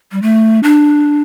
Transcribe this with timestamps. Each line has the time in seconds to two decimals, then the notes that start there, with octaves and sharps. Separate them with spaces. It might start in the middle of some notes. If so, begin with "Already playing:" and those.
0.12 G3
0.22 A3
0.63 D4